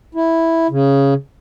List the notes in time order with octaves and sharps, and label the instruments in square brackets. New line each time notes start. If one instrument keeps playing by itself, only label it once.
[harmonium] E4
C#3